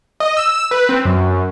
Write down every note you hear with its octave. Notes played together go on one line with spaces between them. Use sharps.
D#5
E6
B4
C4
F#2